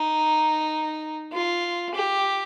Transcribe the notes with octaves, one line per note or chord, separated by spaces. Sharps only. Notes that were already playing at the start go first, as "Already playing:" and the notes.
Already playing: D#4
F4
G4